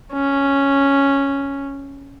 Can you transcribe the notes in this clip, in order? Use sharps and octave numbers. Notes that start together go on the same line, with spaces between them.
C#4